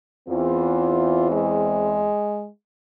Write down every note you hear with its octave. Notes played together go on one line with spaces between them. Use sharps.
E2 E3 C4 F4
G#3